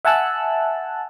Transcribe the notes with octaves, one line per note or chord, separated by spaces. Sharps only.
E5 F#5 G#5 A5 E6 F#6